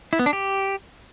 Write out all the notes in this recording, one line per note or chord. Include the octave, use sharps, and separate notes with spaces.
E4
B3
D4
G4